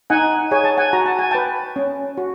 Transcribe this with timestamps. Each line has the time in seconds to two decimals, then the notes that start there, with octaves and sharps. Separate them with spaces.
0.10 D#4 F#5 G#5
0.51 G#4 C#5 G#5
0.64 A5
0.77 F#5 G#5
0.93 F#4 A#5
1.06 A5
1.19 G#5
1.31 B4 G5 A5
1.76 C#4
2.18 F#4